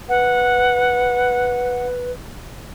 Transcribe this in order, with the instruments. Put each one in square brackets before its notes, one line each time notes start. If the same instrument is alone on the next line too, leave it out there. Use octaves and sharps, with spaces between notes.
[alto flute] B4 [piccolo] F#5